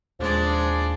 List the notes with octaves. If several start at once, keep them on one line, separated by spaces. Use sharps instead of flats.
D#1 F3 G#3 D4 G#4 D5